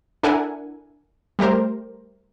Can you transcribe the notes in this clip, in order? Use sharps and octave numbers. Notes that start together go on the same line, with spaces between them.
D4 E4 A4 A#4 F#5 G#5
G3 A3 G4 A#4 C5